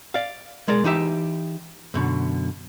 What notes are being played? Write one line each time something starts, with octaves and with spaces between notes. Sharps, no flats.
D5 F5
B1 G#3 A#4 D5
E3 D#4 G4 E5
F#2 B2 D3